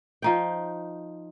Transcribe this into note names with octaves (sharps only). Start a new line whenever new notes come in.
F3 D#4 G5